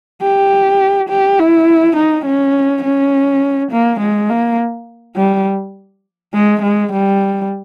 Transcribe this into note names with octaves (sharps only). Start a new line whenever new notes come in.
G4
G4
E4
D#4
C#4
C#4
A#3
G#3
A#3
G3
G#3
G#3
G3